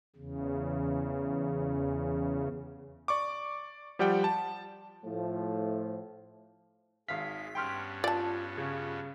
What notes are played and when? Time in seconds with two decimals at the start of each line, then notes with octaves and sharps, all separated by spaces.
0.16 E2 C#3
3.08 D5 C#6 D6
3.99 F3 G3 G4 D5 F#5 G5
4.24 A5
5.04 A2 F3
7.08 G#1 G#3 F5 B6
7.55 G2 B3 C#4 G5 C6 F6
8.04 F4 D5 A5
8.57 C#3